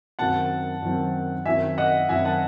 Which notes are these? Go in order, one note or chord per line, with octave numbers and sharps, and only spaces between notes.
F#2 D#3 F#3 C4 F#5 A5
F#2 D#3 F#3 C4
F#2 D#3 F#3 C4 E5 G#5
D#5 F#5
F#2 D#3 F#3 C4 E5 G#5
F#5 A5